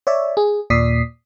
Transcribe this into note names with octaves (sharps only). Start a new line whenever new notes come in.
C#5 D5 E5
G#4
D#2 A#2 D5 D#6 B6 C7